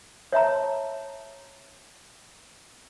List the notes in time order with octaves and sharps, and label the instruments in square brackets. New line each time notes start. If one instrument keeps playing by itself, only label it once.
[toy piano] C#5 E5 A5 A#5